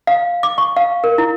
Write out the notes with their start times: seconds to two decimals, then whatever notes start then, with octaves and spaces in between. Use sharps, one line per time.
0.07 F5
0.43 D6
0.58 C#6
0.77 F5
1.04 A#4
1.18 E4